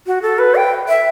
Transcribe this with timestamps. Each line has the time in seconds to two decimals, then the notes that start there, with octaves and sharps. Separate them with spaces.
0.07 F#4
0.22 A4
0.39 B4
0.55 G5
0.88 E5